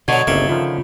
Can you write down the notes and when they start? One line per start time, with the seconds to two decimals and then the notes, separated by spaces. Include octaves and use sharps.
0.08 B2 D3 F#3 D#5 C#6 G#6
0.27 G1 C2 C#3 A#3 E5
0.49 D3 D#3 F3 F4